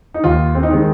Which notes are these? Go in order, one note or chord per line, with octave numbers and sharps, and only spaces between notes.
D#4
D#2 F4
C4
D#4
D#3 G#3 C4